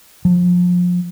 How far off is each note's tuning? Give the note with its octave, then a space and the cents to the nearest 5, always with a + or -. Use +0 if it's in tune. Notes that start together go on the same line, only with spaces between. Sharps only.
F3 +30